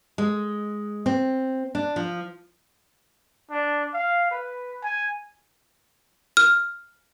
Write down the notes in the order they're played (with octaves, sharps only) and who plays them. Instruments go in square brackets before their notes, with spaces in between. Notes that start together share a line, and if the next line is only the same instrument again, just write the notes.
[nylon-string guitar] G#3
C4
D4
F3
[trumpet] D4
F5
B4
G#5
[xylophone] F6